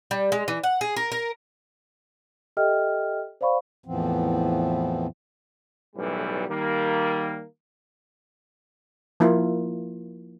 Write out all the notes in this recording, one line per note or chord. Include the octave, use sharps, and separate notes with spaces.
G3
G#3
E3
F#5
G#4
A#4
A#4
G4 A4 D#5 E5 G5 F6
C5 D5 F5 B5 C#6
E2 A2 E3 F3 B3 C4
B1 F#2 A2 E3 G3
D#3 G3 A#3
F3 A#3 E4 F4